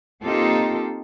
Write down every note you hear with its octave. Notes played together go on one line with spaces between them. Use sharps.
A#3 C4 D#4 F4 G4 A4